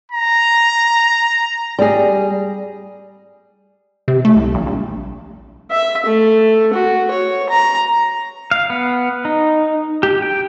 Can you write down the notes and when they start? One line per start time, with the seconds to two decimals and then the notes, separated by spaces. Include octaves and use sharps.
0.12 A#5
1.79 G3 G#4
4.08 C3
4.25 A3
4.36 C2
4.54 A#1
4.66 A#1
5.71 E5
6.06 A3
6.73 F#4
7.11 C#5
7.49 A#5
8.51 F5
8.70 B3
9.25 D#4
10.03 G4
10.22 G5